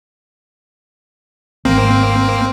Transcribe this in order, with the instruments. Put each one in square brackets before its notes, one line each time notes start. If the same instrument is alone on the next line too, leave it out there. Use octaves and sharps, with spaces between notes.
[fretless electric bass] G#1 [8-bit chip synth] A#3 C4